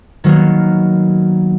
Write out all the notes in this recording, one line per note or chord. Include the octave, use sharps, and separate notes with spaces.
D#3 F#3 A#3 B3